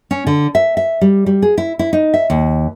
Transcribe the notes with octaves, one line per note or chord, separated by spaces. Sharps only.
C#4
D3
E5
E5
G3
G3
G#4
E4
E4
D#4
E5
D#2